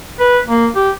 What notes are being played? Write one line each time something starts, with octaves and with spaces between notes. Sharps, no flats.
B4
A#3
G4